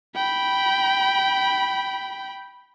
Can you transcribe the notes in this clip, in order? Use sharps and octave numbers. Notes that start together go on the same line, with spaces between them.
G5 B5